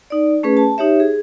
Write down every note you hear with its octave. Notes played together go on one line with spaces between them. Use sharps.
D#4 D5
A3 C#4 G#4 B4
A5
D#4 G4 C#5 E5
G#4